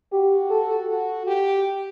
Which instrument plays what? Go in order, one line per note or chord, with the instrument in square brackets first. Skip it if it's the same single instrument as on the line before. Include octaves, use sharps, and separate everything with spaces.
[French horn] F#4 [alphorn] G4
[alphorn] A4
[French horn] F#4
G4